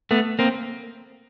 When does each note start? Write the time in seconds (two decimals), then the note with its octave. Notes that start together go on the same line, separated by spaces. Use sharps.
0.11 A3 B3
0.39 A#3 C4